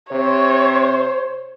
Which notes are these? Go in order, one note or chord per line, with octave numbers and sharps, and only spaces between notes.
C3 C5 C#5